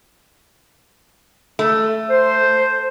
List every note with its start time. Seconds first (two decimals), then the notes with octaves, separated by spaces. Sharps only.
1.59 A3
2.11 C5